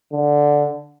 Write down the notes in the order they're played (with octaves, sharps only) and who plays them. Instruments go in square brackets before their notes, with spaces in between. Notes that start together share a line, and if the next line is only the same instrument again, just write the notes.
[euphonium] D3